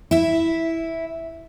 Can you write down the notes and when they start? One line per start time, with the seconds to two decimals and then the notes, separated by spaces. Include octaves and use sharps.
0.11 E4 E5